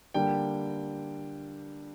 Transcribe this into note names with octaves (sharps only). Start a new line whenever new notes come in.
D3 G3 A#3 G5